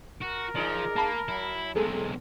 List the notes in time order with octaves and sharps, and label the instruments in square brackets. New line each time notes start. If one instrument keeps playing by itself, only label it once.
[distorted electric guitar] F#4 [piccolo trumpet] A#4
[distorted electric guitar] F3 [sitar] D#4 G#4 D5
[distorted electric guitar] A#3 [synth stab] A5 B5
[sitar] F#3 [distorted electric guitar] E4
[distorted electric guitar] B1 G#3 [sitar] B2 A3 C4 [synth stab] G#4 A4